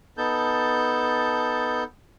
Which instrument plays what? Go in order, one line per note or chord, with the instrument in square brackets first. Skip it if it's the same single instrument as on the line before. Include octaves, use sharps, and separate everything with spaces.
[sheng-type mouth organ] B3 D#4 A4 A5 G6